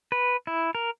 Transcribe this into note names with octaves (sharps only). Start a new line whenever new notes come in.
B4
E4
A#4